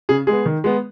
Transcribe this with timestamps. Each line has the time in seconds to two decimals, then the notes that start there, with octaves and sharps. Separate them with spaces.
0.09 C#3 G#4
0.27 G#3 B3 G#4
0.46 D#3
0.64 G#3 B3